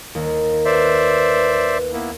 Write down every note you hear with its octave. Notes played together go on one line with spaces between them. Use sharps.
D#2
B4 C5 D5 E5
A#3 B3 E4